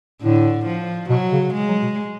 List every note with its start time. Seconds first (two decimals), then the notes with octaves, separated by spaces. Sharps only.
0.22 A2 D3
0.66 F3
1.09 B2 F#3
1.32 C#3
1.54 G#3
1.68 F#3
1.83 B2